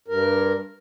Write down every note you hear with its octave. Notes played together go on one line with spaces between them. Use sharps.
G2 A#4